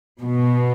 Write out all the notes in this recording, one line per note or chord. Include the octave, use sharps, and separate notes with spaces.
B2